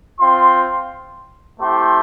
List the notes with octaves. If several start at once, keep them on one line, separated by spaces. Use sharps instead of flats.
C4 F4 C6
A3 C4 E4 G4 C6